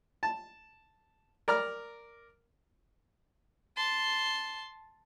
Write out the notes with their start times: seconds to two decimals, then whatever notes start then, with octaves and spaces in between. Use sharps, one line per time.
0.23 A5
1.48 A#4 D5 A#5 F6
3.77 A5 C6